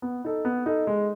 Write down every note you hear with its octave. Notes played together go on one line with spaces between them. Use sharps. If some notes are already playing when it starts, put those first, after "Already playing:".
B3
D#4 A4
B3
D#4 A4
G#3